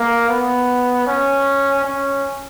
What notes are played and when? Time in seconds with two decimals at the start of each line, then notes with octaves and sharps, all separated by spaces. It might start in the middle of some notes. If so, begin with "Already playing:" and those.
Already playing: A#3
0.29 B3
1.07 C#4
1.85 C#4